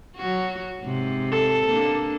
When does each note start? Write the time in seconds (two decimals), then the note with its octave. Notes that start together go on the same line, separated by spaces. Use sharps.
0.17 F#3 F#4
0.81 G#2 C3
1.31 A4
1.67 A#3 D4